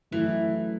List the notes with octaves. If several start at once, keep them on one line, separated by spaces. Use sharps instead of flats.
F#2 E3 F#3 A3 E4